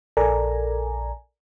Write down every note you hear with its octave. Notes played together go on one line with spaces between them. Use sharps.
A#1 A4 A#4 D5 G#5 A#5